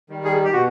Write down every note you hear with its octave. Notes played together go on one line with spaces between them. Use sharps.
D#3 G3
G#4
G4
B2 F#4